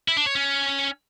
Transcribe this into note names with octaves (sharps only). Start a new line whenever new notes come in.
E4
D4
C#5
C#4